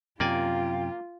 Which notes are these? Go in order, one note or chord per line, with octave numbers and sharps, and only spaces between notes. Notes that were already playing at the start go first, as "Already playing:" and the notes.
F#2 C3 A#3 F4 D5 G5 G#5